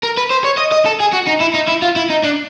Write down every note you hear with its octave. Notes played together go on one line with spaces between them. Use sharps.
A#4
B4
C5
C#5
D#5
D#5
A4
G#4
F#4
D#4
E4
D#4
E4
F4
E4
D#4
D4